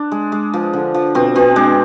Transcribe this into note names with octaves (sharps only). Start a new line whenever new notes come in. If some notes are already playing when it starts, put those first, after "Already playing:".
Already playing: D4
G#3
G#3
F3
D3
F3
B2 C4
B2 C4
G#3 D4